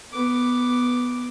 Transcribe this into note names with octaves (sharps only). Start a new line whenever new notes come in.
B3 D6